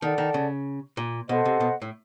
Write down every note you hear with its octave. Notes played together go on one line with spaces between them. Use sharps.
D#3 A4 D5 F#5 A5
D#3
C#3
A#2
B2 A4 C5 D#5 F#5
C3
B2
A2